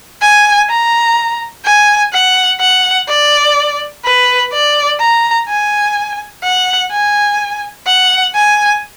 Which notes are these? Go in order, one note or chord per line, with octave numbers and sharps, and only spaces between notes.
G#5
A#5
G#5
F#5
F#5
D5
B4
D5
A#5
G#5
F#5
G#5
F#5
G#5